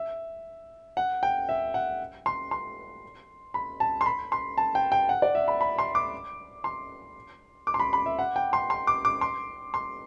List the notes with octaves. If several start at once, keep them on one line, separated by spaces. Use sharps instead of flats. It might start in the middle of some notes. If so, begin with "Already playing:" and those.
Already playing: E5
F#5
G5
E5
F#5
C6
C6
B5
A5
C6
B5
C6
A5
G5
G5
F#5
D5
E5
B5
B5
C6
D6
C6
D6
C6
B5
B5
E5
F#5
G5
C6
C6
D6
D6
C6
C6